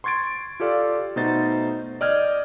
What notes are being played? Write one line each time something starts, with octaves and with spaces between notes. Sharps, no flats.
C6 C#6 G#6 A6 D7
F4 G4 A4 D5 F5
B2 A3 D#4 C5 A6
D5 D#5 F6 G6 G#6